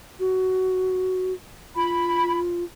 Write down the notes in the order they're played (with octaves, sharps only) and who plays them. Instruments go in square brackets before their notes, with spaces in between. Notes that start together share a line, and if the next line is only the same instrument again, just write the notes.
[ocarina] F#4
[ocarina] F4 [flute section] B5